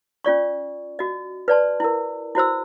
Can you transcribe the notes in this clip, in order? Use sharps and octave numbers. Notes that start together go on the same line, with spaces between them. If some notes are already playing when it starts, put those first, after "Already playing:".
C#4 F4 D5 C#6
F#4 D#5
B4 D5 A5 C6
E4 A#4
E4 F#4 C5 E6